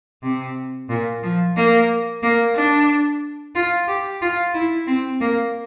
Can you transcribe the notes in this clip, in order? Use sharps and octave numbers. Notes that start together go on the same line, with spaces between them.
C3
A#2
F3
A#3
A#3
D4
F4
G4
F4
E4
C4
A#3